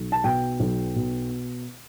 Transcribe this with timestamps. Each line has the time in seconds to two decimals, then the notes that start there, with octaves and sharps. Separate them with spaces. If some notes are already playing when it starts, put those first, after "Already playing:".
Already playing: B1
0.12 A5
0.24 B2 G5
0.60 B1
0.96 B2